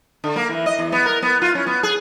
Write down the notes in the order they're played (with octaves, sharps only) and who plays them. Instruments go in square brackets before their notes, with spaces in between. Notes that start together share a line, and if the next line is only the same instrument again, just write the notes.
[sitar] D3
A#3
E3
D#5
E2
B3
A#4
B3
F4
C#4
B3
G#4